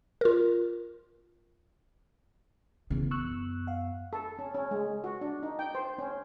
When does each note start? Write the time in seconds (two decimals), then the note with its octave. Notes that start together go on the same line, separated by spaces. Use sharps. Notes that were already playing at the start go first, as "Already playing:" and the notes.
0.21 F4 A#4
2.91 F#2 C#3 E3 B3
3.11 C#6 E6 F#6
3.67 F5 F#5
4.13 A4
4.39 C#4
4.54 C#4
4.71 G#3
5.04 F#4
5.21 D4
5.43 D#4
5.59 G5
5.75 C5
5.98 C#4